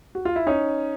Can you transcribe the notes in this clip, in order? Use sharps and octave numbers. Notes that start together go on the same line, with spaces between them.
F#4
F4
E4
C#4 D#4